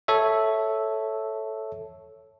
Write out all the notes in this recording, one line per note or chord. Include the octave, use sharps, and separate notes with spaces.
A4 C#5 E5